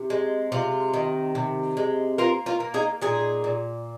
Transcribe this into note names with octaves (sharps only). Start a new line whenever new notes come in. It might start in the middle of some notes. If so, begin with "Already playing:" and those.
Already playing: C3
G#3
C3 F4
D#3
C3
G#3
A#3 F4 A#4
F4 A#4
A#3
D#4 G#4
A#2 D#4 G#4
A#2